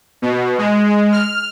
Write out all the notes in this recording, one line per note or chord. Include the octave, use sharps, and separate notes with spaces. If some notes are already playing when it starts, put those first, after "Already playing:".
B2
G#3
F6